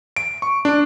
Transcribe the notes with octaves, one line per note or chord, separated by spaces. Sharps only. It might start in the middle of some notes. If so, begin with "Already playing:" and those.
D7
C#6
D4